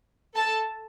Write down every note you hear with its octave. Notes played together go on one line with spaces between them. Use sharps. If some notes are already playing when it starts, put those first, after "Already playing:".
A4 A5